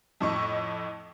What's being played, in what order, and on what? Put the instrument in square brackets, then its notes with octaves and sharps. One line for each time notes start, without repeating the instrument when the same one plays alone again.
[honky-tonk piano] F2 A2 D#5 C#6